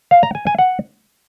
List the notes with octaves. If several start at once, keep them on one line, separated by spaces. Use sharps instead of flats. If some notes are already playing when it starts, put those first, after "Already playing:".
F5
A#5
G#5
G#5
F#5